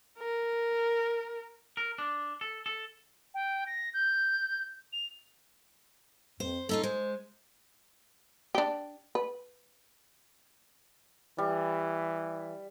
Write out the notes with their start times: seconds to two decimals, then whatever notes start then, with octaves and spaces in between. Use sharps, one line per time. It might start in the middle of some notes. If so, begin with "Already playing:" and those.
0.19 A#4
1.77 A#4
1.98 D4
2.41 A4
2.66 A4
3.34 G5
3.66 A#6
3.94 G6
4.93 F7
6.40 F2 C5
6.69 C#4 D#4 F4 A4
6.83 G#3 C5
8.55 D4 G4
9.15 B4
11.38 E3 G3